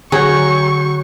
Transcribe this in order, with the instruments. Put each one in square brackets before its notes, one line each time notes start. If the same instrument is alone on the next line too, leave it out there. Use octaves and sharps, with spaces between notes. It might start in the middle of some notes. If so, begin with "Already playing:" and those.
[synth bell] D3 G6 [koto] F#3 [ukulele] G#4 [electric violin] C#6